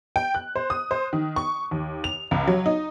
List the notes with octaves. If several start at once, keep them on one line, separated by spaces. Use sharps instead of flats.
G5
F#6
C5
D#6
C5
D#3
C#6
D#2
F7
C#2
F#3
D#4